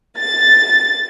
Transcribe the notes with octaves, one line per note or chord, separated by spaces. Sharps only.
A6